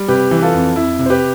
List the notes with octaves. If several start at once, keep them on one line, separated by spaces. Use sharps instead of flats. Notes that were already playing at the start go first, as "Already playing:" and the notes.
Already playing: G3
C3 G4 B4
E3
F4 A4
F2
F2 E4
C3
C5
G4 B4